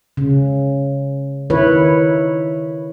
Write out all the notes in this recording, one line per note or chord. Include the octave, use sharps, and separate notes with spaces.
C#3
D#3 E4 B4 C#5